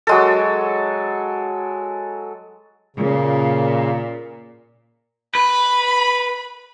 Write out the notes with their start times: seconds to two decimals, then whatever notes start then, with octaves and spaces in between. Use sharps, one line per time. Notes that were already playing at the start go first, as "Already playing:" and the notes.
0.07 F#3 G#3 A4
2.97 A#2 C#3
5.35 B4 B5